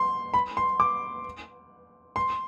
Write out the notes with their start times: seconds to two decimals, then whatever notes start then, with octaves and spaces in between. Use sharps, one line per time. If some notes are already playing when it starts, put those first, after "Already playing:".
Already playing: C6
0.34 B5
0.57 C6
0.80 D6
2.16 C6